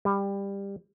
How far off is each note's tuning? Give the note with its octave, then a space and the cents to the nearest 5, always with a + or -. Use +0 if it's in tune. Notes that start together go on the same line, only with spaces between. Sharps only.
G3 +20